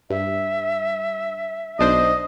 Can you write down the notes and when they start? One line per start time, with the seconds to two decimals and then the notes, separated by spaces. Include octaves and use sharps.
0.10 G2 E5
1.79 B1 D4 C5 D#5